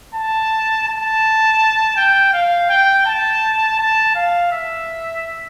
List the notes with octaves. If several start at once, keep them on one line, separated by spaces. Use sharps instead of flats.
A5
A5
G5
F5
G5
A5
A5
F5
E5